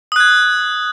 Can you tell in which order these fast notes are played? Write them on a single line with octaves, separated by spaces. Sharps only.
D#6 F#6 G#6